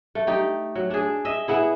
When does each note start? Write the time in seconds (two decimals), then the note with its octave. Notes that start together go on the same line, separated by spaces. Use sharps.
0.15 A3
0.27 D#4 G4
0.75 F#3
0.90 D4 G#4
1.25 D#5 E5
1.48 B3 E4 G#4